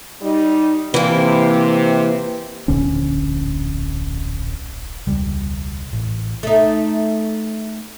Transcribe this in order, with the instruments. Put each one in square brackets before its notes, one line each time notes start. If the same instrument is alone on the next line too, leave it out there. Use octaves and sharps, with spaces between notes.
[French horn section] G3 D#4
[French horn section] C3 [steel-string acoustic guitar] E3 A#3
[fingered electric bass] D1 A#1 D3 C#4
[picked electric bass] E1 C#2 G3
A1
[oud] A3 D#4